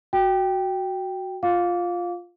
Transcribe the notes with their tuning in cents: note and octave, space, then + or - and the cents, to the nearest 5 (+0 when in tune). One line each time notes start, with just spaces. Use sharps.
F#4 +0 G5 +0
F4 +0 F5 +15 D6 -25